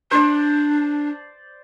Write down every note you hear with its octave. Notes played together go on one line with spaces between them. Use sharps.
D4 C5 D5